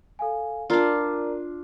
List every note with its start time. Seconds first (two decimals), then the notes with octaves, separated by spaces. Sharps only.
0.19 A4 F5 G#5
0.70 D4 F4 A#4 D5 A#5